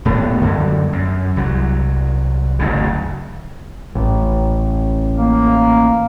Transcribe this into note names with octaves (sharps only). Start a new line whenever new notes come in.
D#1 A2 A3 B3
F#2 D3 F#3 G3
F#2
C2 F#3
F#1 D2 G2 C#3
A1
A#3